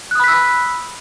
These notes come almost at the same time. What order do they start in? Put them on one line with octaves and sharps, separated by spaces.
F#6 D#6 B5 B6 E6